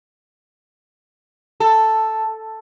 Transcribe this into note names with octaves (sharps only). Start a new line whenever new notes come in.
A4